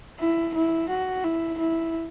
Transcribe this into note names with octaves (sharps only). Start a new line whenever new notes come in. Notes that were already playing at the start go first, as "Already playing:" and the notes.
E4
E4
F#4
E4
E4